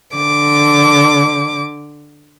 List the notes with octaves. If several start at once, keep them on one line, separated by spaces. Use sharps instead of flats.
D3 D6